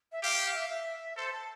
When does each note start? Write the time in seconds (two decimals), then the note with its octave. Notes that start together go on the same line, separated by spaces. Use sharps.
0.12 E5
0.23 G4 F5
0.54 E5
0.69 E5
1.17 A4 C5
1.33 A5